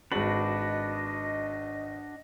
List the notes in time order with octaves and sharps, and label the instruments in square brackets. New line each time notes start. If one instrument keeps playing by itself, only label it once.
[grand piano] G#1 G#3 F#7 [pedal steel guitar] D4 F#4 B4 [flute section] D#5